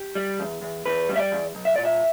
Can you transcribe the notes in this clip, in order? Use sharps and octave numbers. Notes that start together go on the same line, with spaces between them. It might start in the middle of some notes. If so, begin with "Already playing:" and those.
Already playing: G4
G3
E2
E2
E2 B4
G3
E5
D5
E2
B1
E5
A#2 D5
E5